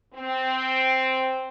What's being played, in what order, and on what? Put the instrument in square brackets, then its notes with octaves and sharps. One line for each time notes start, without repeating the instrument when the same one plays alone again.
[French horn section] C4